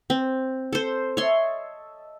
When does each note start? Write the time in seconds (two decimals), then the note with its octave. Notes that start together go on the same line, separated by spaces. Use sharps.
0.10 C4
0.73 A4 C5
1.17 A4 C#5 D#5 E5 C6